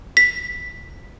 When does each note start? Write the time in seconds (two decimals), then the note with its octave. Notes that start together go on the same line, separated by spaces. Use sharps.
0.17 B6